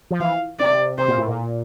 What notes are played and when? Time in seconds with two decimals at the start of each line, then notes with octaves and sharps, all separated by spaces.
0.11 F3
0.20 E3 F5
0.59 C3 D5
0.98 C3 C5
1.08 A#2
1.18 A2
1.28 A#2